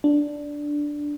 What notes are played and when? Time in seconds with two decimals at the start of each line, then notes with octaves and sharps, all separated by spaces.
0.04 D4